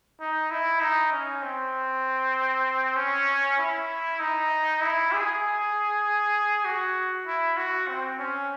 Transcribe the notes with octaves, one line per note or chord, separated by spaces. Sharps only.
D#4
E4
D#4
C#4
C4
C#4
E4
D#4
E4
G#4
F#4
E4
F#4
C4
C#4